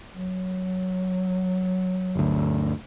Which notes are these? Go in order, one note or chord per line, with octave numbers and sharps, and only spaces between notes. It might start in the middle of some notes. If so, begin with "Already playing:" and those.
F#3
G1 D2